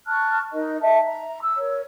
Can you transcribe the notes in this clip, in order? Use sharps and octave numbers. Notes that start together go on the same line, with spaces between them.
A5 C#6 F6 F#6
D#4 A#4 D#5
D#5 E5 A5
A#5
E6
A#4 C#5